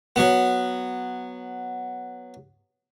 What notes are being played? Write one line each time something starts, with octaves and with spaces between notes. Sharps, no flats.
F#3 B3